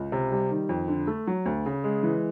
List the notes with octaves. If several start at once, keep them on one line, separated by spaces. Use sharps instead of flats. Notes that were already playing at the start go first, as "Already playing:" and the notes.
Already playing: C#2
C3
G3
D#3
F2
D3
A3
F#3
D2
C#3
G#3
E3